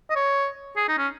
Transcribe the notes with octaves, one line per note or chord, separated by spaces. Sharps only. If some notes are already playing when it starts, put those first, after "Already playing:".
D#5
C#5
G#4
D#4
C#4